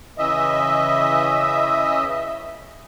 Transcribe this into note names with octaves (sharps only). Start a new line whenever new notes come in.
C#3 E3 D#5 E5